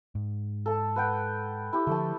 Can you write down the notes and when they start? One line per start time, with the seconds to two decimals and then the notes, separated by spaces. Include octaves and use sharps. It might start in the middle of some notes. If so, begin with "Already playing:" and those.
0.15 G#2
0.66 A4 A5
0.96 B4 F#5 G5
1.73 E4 G4
1.87 D3 F3 A3 A5